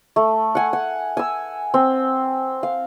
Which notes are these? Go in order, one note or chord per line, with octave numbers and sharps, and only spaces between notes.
A3
F#5 G#5
F#5
G#5 E6
C4
F5